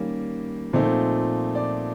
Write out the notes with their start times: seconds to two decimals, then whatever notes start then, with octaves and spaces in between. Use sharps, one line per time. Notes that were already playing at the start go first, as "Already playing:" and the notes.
Already playing: D#3 G3 A#3 C#4
0.73 A#2 F3 A3 C4 D#4
1.55 D5